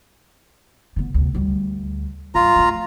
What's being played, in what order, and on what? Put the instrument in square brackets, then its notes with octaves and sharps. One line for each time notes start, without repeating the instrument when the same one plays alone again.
[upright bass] D3 B3
D2 C3
D2 G3
[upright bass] G2 [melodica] F4 A#5
[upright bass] F3 A3